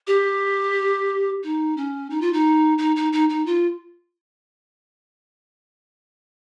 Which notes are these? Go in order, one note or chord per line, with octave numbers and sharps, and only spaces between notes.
G4
D#4
C#4
D#4
F4
D#4
D#4
D#4
D#4
D#4
F4